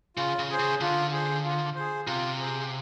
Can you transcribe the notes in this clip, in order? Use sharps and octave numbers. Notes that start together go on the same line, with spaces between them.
C#3 F4
C#3
G#4 C5
C#3
D3 F4
G#4 C5
F4
G#4 C5
C3 F4
G#4 C5